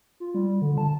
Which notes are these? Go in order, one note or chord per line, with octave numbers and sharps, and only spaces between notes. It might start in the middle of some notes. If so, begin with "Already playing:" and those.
F4
G3
D3
A5